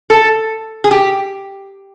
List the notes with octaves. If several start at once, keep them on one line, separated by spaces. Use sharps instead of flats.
A4
G#4
G4